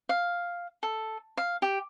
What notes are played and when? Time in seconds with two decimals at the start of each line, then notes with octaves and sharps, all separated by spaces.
0.09 F5
0.83 A4
1.37 F5
1.62 G4